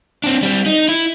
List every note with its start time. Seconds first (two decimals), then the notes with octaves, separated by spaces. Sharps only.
0.24 C4 D4
0.43 G3 C4
0.66 D#4
0.88 E4